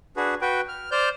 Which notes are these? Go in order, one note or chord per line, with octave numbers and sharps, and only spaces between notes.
D4 F#4 G#4 B4
F#4 B4 G5
F6
C5 D5 F6 G6